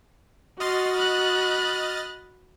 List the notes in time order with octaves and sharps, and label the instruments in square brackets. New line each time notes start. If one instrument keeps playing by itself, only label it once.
[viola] F#4 [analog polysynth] D#5 F6 A6 [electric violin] C6
[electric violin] B5 F#6